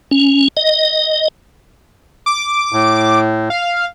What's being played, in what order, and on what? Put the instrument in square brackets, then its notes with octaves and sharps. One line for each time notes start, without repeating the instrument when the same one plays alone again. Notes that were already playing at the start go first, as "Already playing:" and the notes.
[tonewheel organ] C#4
D#5
[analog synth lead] D6
[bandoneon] A2
[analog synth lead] F5